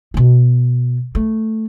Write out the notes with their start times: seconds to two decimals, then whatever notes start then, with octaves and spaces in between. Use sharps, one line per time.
0.14 B2 B3
1.15 A3